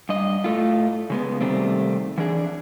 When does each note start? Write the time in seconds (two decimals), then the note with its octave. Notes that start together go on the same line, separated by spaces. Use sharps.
0.09 G2 D#5
0.44 A2 A3 F4
1.10 C#3 G#3 B3
1.41 C3 D#3 G3 A3 C4
2.18 E3 D4 G#4